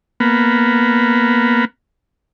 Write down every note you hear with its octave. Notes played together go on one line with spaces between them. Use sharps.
A#3 B3